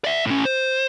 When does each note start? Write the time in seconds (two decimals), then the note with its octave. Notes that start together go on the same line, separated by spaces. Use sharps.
0.04 D5 E5
0.26 A2 C#4
0.45 C5